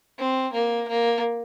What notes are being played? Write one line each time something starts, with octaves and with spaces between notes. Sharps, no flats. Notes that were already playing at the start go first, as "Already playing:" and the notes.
C4
A#3
A#3